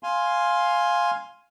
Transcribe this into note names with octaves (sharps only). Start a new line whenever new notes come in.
F5 G#5 C6